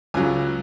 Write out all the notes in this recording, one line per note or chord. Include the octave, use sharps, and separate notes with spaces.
C#2 C#3 F#3 G#5